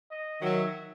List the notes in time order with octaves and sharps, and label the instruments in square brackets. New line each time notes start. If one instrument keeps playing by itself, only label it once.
[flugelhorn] D#5
[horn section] D#3 F#3 [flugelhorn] E5